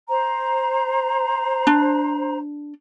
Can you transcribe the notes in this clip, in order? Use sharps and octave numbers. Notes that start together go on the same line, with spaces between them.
C5 A#5
D4